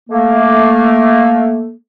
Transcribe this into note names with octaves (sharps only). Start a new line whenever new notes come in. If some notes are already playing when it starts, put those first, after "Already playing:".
A3 A#3